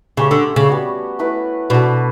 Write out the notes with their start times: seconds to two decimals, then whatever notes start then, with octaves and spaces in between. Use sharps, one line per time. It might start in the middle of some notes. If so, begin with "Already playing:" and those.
0.17 C#3 A3 C#4 G4 C#5
0.31 D3
0.56 C#3
0.69 G3 B3 F#4
1.19 A3 E4 B4
1.70 B2 D4 F#4 A4